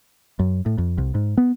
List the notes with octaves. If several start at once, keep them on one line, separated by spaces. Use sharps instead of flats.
F#2
A2
F2
C2
G#2
B3